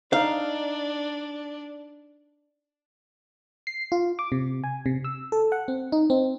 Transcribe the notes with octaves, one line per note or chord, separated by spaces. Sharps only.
D4 D#4 F5
C7
F4
D6
C3
G#5
C3
E6
A4
F#5
C4
D#4
C4